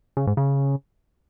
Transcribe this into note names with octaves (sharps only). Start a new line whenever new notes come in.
C#3
G#2
C#3